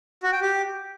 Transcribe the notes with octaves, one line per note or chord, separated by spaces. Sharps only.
F#4
G5
G4